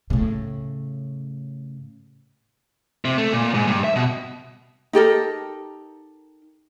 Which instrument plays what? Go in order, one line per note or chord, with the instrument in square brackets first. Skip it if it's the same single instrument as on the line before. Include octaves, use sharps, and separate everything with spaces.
[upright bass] A2 C#3
[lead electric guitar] C3
A3
A#2
G#2
G2
E5
B2
[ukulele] D#4 G4 A4 A#4